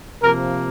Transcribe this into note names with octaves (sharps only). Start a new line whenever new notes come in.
C3 F3 A#3 A#4